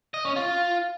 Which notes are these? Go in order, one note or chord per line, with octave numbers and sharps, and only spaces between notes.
D#5
C#4
F4